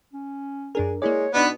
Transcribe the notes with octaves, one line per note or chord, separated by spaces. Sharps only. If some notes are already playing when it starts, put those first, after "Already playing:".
C#4
F#2 D4 G#4 A#4
G#3 A#3 E4 C#5 D5
B2 B3 D4 D#4 B4 D5